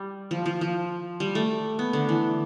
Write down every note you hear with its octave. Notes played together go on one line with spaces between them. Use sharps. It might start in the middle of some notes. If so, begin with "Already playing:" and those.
Already playing: G3
F3
F3
F3
G3
A3
B3
D3
E3